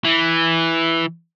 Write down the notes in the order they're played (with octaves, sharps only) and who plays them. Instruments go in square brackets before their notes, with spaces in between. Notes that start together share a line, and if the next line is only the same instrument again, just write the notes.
[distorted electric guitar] E3